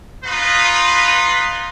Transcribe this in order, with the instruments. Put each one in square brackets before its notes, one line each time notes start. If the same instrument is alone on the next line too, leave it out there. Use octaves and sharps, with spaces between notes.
[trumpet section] D#4 F4 B4